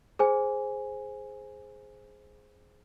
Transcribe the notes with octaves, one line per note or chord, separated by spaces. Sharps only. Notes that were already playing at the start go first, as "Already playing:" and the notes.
G#4 C5 G#5